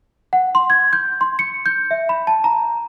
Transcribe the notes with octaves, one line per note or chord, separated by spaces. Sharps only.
F#5
C6
G#6
G6
C6
C#7
G6
E5
B5
A5
A#5